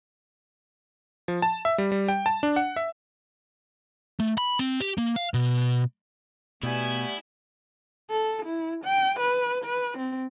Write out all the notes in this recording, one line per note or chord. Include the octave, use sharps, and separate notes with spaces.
F3
A5
E5
G3
G3
G5
A5
D4
F#5
E5
A3
B5
C4
G4
A#3
F5
B2
B2 G3 A3 B3 E4 G#5
A4
E4
G5
B4
B4
C4